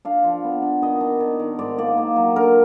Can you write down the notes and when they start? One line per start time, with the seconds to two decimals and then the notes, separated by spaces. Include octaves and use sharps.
0.05 D4 F5
0.24 F3
0.44 B3
0.62 D4
0.82 D#3 D#5
1.00 D4
1.20 D#3
1.40 D#3
1.59 G#2 D5
1.78 A#3 D5
1.97 A#3
2.16 F#3
2.36 D3 A#4